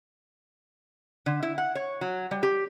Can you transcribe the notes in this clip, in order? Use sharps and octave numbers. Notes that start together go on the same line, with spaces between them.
D3
E4
F#5
C#5
F#3
G3
G4